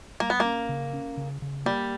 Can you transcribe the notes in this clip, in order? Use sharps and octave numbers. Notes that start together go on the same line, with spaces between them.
G3 A#3
B3
A#3 C#4
C#3
C#4
C#3
C#3
G3 A#3